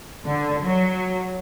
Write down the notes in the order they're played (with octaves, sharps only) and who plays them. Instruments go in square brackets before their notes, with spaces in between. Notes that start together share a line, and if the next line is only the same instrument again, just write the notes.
[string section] D3
F#3